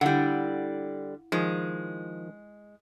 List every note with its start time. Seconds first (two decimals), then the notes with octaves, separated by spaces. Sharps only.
0.01 D3 G3 E4 F5 F#5
1.32 D#3 F3 G#3